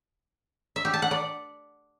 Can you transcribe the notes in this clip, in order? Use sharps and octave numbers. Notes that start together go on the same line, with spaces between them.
E5
G4
A5
F#5
D5